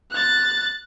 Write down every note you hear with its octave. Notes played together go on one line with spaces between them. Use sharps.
F#6 A6